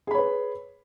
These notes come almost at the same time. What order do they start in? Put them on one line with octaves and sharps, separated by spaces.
G#4 B5 C#5 B4